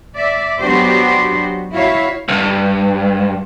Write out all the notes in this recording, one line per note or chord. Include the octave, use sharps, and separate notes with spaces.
D5 E5
F#3 B3 D4 F#4 G4 C5
E4 F#4 C#5 E5 F5
B1 G2